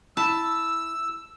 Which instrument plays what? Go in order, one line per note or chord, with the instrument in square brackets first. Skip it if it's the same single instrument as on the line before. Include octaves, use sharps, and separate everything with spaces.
[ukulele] E4 [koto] A5 [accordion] E6